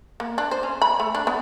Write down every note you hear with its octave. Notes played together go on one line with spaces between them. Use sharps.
A#3
D4
C5
C#4
B5
A3
D4
B3